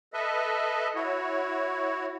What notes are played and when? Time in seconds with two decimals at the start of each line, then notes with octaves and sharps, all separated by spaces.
0.13 A4 B4 D#5 E5
0.95 E4 F#4 C#5